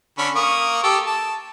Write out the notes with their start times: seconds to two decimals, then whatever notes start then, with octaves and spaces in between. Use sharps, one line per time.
0.18 D3 C#4 B5
0.36 A#3 C#6 D#6
0.84 G4 A4
1.06 A5